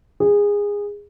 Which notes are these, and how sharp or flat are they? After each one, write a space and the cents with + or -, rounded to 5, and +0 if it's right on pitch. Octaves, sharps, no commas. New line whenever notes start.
G#4 -20